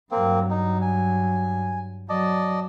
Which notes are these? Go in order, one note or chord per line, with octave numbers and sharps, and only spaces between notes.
G2 F#3 A#3 C4
D#4
G#5
F#3 D5 D#5 A5